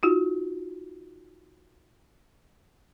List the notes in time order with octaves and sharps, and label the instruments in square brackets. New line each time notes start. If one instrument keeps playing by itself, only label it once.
[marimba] D#4 F4 F#4